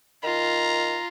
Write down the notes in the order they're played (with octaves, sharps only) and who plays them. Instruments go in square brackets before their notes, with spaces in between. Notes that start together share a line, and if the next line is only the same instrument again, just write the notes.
[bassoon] D#3 [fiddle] F4 [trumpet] A#5